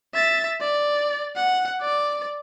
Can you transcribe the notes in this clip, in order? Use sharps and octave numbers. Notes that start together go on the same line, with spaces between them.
E5 A6
D5
F#5
D5 D6